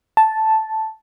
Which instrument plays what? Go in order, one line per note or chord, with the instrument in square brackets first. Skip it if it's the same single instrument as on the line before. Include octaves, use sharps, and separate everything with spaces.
[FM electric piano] A5